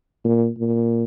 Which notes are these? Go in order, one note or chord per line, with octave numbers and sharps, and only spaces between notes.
A#2
A#2